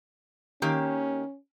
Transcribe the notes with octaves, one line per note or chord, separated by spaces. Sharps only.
D#3 A#3 C#4 G4